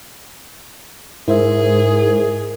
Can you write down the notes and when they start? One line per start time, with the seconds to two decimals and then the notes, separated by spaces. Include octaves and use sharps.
1.28 G#2 E4 G#4 A#4 C5 E5